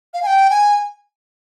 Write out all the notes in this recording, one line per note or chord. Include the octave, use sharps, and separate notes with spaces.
F5
G#5
G5
G#5